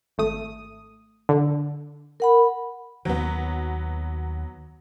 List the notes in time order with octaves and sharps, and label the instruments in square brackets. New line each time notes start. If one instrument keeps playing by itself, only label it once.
[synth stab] G#1 A3 D#6
D3
[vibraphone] A#4 F#5 B5
[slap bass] D#2 D#3 [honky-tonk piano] F#3 B3